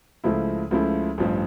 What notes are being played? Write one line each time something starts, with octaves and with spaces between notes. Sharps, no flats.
C#2 C#3 F3 A3 E4
C#2 C#3 F3 A3 E4
A1 G2 F3